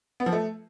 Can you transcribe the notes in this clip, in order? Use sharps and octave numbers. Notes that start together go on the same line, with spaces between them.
B3
F3
A3